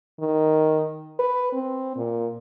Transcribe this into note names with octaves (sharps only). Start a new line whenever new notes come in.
D#3
B4
C4
A#2